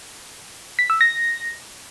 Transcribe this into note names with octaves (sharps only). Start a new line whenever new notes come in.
B6
E6
A#6